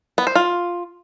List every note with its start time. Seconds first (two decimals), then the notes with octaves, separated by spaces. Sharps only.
0.18 B3
0.27 C5
0.35 F4